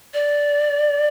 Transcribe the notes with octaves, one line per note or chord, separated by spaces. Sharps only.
D5